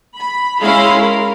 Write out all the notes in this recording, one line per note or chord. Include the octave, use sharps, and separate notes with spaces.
B5
G#3 C#4 E4 F5 B5 C6
A#4